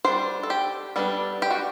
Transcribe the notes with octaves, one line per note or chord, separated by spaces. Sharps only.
G3 D4 C5
A4
G4
G3 B3 D4 A4
G4
F#4